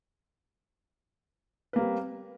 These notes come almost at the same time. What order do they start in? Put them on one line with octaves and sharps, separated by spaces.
B4 A#3 G3 C4